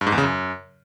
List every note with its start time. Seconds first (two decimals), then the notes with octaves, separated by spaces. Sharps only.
0.01 G2
0.07 G#2
0.12 E2
0.18 C#3
0.23 F#2